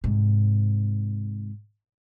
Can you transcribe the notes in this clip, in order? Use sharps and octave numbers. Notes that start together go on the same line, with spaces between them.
G#2 C3